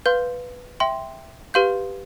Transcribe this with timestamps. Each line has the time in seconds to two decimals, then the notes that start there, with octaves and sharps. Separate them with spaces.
0.06 B4 F5 C6 G6
0.80 E5 G5 C6
1.54 G4 B4 F5 C6 G6